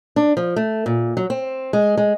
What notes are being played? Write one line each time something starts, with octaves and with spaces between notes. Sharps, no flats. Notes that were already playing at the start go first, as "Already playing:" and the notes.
D4
F3
A3
A#2
F#3
C4
G#3
G#3